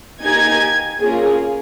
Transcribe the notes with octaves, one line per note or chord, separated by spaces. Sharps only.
A#3 D#4 G4 G#5 G#6
A#3 C#4 F4 G#4